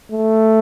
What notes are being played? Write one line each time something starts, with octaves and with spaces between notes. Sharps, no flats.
A3